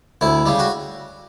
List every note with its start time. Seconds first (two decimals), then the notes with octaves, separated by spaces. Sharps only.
0.21 D2 E4
0.46 C#3 G3
0.59 F#4